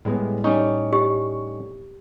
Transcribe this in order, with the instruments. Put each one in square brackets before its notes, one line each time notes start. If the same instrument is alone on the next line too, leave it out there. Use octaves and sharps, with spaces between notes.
[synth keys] A2 [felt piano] G3 G#3 B3
[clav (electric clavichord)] G3 C#4 D#4 [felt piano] C#6
[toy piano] G4